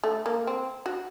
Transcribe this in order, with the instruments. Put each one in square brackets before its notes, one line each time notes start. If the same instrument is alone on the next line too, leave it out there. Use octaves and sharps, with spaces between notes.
[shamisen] A3
A#3
C4
F#4